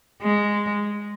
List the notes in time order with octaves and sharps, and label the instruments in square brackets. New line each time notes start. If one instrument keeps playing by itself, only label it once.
[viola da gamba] G#3